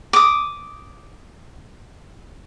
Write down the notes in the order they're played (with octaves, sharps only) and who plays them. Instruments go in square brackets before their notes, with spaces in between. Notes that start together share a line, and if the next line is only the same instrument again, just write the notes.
[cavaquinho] D6 D#6